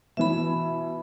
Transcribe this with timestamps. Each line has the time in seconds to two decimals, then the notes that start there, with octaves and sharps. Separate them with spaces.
0.17 B2 E3 E5 B5